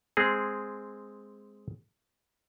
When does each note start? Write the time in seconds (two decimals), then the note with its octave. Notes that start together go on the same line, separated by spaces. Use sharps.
0.17 G#3 C4 G#4